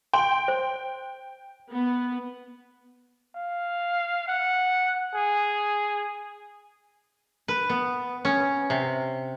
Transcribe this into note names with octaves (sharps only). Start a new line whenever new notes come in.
G5 C6
C5
B3
F5
F#5
G#4
B4
B3
C#4
C3